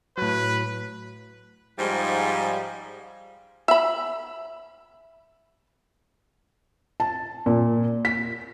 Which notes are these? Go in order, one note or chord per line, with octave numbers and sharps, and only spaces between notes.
A2 F#3 B4
G#2 F3 G3
E5 B5
A5
A#2
B6